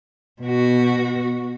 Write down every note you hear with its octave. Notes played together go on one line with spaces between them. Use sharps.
B2 F#4